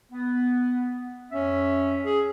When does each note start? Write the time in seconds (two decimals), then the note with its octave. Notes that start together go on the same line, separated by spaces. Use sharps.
0.12 B3
1.31 F2 C#4 E5
2.04 G#4